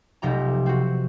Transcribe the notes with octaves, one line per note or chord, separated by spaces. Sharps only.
F1 B1 C3 G4 A#5
C4 F#4